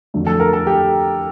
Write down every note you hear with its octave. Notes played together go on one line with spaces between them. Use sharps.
F2 D3 F#3 A3
A4
A#4
A4
G4